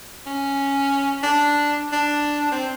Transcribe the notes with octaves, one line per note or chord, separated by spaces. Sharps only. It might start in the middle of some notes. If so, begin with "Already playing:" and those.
C#4
D4
D4
C4